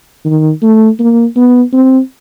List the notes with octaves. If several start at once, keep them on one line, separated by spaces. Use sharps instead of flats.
D#3
A3
A#3
B3
C4